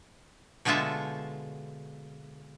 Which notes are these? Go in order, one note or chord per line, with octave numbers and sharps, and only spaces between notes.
B2 D3 G#3 F4 E5 A5